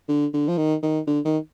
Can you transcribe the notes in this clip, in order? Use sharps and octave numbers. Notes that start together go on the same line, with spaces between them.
D3
D3
F3
D#3
D#3
D3
D#3